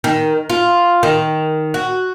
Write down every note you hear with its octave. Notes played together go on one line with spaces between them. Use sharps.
D#3
F4
D#3
F#4